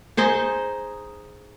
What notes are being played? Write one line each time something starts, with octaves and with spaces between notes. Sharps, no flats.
D#4 G#4 C5 D#5